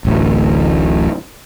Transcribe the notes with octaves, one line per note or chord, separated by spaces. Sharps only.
D1 A1 D2